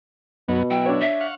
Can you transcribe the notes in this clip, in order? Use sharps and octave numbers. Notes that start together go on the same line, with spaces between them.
F#2 B2 F#3 B3
F#3 E4 G5
D4 C#5
E5
F5 F#5 C#6